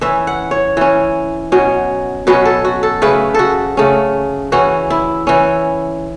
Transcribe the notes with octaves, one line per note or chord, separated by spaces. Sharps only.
E3 C#4 E5
F#5
C#5
E3 C#4
B2 F#3 C#4
B2 F#3 C#4 B4
A4
F#4
A4
C#3 A3 C#4 B4
F#4 A4
C#3 A3 C#4
E3 C#4 F#4
E4
E3 C#4